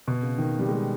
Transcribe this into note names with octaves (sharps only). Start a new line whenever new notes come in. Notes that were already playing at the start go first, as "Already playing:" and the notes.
B2
C#3
D#3
G3
G#3